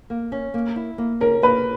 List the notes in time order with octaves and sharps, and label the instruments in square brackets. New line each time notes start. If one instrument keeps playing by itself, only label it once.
[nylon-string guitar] A#3
C#4
A#3
E4
A#3
[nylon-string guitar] C#4 [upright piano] A#4
[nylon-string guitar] A#3 [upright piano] B4